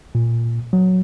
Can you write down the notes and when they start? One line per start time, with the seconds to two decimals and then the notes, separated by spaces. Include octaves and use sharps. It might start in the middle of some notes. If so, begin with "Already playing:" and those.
0.15 A#2
0.73 F#3